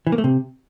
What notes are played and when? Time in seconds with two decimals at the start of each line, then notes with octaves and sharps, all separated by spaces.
0.07 E3
0.12 A#3
0.18 A3
0.24 C3